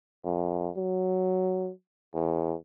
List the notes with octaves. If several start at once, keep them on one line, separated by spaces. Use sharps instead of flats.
F2
F#3
E2